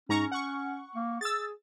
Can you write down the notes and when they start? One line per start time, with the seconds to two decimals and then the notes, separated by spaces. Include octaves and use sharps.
0.09 G#2 C#4 A#5 C#6
0.32 F#5 C#6
0.96 A#3
1.21 G#4 E6 A6